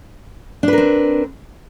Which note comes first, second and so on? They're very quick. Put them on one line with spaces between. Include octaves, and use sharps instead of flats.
D4 B4 A#4 C4